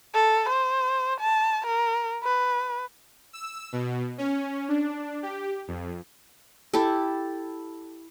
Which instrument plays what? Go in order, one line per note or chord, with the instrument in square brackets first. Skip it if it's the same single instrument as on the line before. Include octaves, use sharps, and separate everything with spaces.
[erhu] A4
C5
A5
A#4
B4
[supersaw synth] E6
B2
C#4
D4
G4
F2
[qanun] E4 G4 A4